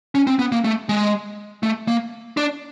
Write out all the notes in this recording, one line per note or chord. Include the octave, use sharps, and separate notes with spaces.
C#4
C4
B3
A#3
A3
G#3
A3
A#3
D4